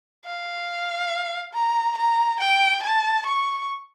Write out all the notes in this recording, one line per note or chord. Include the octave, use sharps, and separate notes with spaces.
F5
A#5
A#5
G5
A5
C#6